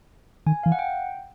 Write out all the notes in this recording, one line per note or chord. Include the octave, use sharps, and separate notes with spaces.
D#3 G#5
E3 F5
F#5
G5